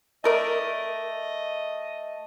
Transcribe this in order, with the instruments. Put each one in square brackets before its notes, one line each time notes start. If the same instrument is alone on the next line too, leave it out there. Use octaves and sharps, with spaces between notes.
[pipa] A3 A#4 D5 [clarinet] D#5